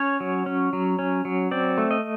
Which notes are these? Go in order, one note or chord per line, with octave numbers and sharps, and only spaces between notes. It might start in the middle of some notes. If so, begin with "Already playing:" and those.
Already playing: C#4 C#5
F#3
C#4
F#3
C#4
F#3
C4 D5
A3
D#5